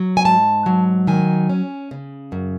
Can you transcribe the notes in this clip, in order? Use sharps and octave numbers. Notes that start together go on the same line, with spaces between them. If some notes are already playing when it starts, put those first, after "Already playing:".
Already playing: F#3
G#5
G#2 A5
F#3
D#3 G#5
C#4
C#3
F#2